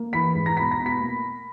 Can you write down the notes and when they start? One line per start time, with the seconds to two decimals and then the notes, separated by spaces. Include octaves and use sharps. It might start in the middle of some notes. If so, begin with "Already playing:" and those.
Already playing: A#3
0.13 E3 B5 B6
0.35 G#2
0.46 A#5 A#6
0.57 B2 B5 B6
0.71 A#5 A#6
0.79 B2
0.86 B5 B6
1.00 A#3